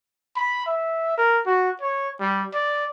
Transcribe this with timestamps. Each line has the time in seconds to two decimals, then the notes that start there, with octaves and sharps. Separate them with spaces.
0.36 B5
0.66 E5
1.17 A#4
1.46 F#4
1.81 C#5
2.20 G3
2.54 D5